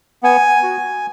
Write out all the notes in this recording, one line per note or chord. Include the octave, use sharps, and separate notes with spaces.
B3 G#5
F#4